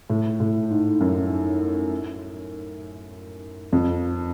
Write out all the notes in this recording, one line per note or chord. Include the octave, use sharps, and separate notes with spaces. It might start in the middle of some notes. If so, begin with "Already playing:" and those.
A2
A2
G#2
F#2
F2